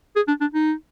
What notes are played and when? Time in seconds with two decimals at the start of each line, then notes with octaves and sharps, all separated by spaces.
0.16 G#4
0.28 D4
0.41 D4
0.54 D#4